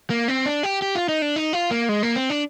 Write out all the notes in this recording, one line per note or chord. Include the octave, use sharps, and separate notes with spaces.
A#3
C4
D4
G4
G4
F4
D#4
D4
D#4
F4
A#3
G#3
A#3
C4
D4